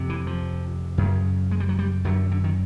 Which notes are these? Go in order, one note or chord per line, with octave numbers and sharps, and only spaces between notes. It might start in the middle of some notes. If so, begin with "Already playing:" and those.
Already playing: F2 C3
E3
F3
F#2 C#3
G#3
G3
F#3
G3
F#2 D3 F#3
D3
D#3